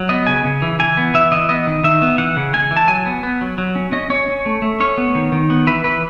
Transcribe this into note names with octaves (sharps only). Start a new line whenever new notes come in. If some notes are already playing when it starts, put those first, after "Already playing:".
Already playing: F#3
B3 D#5
C#3 G#5
C#3
E3
E3 G#5
B3
E3 E5
E3 D#5
B3 D#5
D#3
D#3 E5
B3
E3 F#5
C#3
G#3 G#5
E3
A5
F#3 G#5
B3
B3
F#3
F#3
C#4
C#4 D#5
C#4 C#5
C#4
A3
A3
C#4 C#5
B3
D#3
D#3
B3
E3 B4
E3 B4